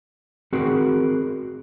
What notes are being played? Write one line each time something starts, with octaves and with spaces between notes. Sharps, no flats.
C4 F#4 G#4 A#4